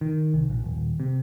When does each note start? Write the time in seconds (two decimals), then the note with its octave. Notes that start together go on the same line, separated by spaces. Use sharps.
0.01 D#3
0.34 C2
0.50 A#1
0.64 D#1
1.00 C3